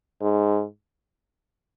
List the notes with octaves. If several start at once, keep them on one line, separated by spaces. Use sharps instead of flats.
G#2